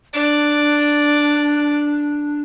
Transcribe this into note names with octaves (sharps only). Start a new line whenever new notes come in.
D4 D5